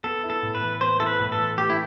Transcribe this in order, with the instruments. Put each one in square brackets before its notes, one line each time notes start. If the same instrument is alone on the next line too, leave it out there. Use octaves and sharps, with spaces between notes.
[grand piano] B3 [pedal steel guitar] A4
[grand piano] E4
[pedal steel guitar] A4
[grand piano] A2
[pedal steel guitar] B4
[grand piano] E3
[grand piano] B3 [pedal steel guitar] C5
[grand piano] E4 [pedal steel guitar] A4
[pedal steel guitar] B4
[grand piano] A2
[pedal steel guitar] A4
[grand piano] E3
[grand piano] A3 [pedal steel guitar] G4
[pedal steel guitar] E4